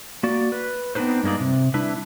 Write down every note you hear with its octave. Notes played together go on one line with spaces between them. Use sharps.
A#3 F#4 D5
B4
B3 C4 D4 D#4 B4 C5
G2 G#3 A#3 D#4 D5
C3
G3 D4 E4 B4